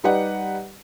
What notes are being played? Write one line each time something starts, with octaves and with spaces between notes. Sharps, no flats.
G3 D#4 G4 B4 D5 F#5